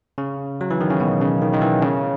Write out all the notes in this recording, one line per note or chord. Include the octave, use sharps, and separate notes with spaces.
C#3
F#3
E3
D#3
C#3
B2
C#3
D#3
D#3
E3
C#3